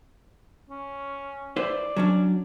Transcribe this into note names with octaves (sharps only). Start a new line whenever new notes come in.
C#4
E4 B4 C5 D5
F#3 C#4 D4